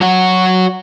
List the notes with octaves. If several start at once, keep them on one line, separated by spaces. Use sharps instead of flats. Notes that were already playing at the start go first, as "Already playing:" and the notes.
F#3 F#4